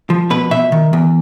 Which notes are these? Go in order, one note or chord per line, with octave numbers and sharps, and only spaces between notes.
F3
B2 B4
B2 E5
D#3
E2